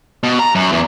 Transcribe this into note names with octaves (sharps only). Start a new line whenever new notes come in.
B2
A#5
F#2
E2